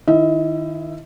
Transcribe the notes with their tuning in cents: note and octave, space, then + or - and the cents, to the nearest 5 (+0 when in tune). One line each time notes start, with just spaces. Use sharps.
D#3 +0 E4 +20 D#5 +35